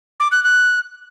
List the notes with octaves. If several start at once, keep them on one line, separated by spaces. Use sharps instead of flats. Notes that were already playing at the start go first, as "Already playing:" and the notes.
D6
F#6
F#6